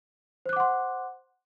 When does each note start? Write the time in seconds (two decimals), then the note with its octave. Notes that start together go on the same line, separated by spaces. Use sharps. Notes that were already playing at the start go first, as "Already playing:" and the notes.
0.46 C5
0.49 F#6
0.53 D6
0.56 F#5
0.60 C6